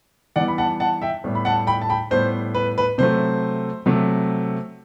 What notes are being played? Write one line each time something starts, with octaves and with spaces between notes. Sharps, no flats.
E3 G3 B3 D5 F#5
B5
F#5 A5
F#5 A5
E5 G5
A2 G3 B3
B5
F#5 A5
G5 B5
A5
G5 B5
A2 G3 B3 C5
B4
B4
C3 F#3 A3 C5
C3 F#3 A3